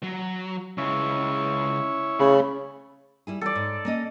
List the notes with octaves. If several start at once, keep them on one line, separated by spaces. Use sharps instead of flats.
F#3
C#3 G#3 C#4 E4 C#5
C#3 A3 B5
G3 E4 G#4
E3 G3 A4 D5
G#2
A#3 C#4 D#5